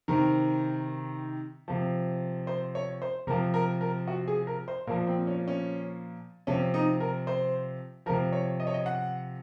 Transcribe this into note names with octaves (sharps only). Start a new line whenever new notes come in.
C3 D#3 A#4
C3 F3
C5
C#5
C5
C3 F3 A#4
A#4
A#4
F#4
G#4
A#4
C5
A#2 F3 A#4
C4
C#4
C#4
C3 F3 C#4
D#4
A#4
C5
C3 F3 A#4
C#5
D#5
C#5
D#5
F#5